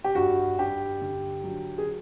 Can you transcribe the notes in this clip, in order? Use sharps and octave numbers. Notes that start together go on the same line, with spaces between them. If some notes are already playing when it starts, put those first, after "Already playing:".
G4
G2 F#4
G2 G4
D3
F#3
G#4